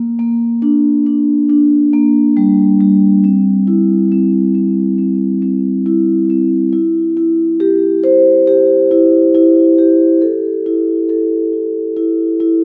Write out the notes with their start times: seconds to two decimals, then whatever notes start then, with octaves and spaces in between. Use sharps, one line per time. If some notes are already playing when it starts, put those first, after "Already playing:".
Already playing: A#3
0.19 A#3
0.62 D4
1.06 D4
1.49 D4
1.93 A#3
2.37 G3
2.81 G3
3.24 C4
3.67 E4
4.12 C4
4.55 C4
4.98 C4
5.42 C4
5.86 E4
6.30 C4
6.73 E4
7.17 E4
7.60 G4
8.04 C5
8.47 G4
8.91 E4
9.34 E4
9.78 G4
10.22 A4
10.66 E4
11.09 A4
11.53 E4
11.96 E4
12.40 E4